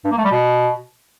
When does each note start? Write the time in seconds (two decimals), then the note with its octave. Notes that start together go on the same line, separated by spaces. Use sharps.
0.05 G2
0.11 A#3
0.18 A3
0.25 G3
0.32 B2